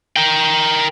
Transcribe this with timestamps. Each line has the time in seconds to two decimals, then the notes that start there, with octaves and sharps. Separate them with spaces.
0.16 A#4 G5